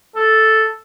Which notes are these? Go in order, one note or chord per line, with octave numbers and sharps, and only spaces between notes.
A4